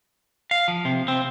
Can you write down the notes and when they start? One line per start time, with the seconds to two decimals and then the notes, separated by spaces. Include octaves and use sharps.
0.51 F5
0.68 F3
0.85 C3
1.08 C4